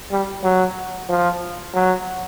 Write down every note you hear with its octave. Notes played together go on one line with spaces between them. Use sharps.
G3
F#3
F3
F#3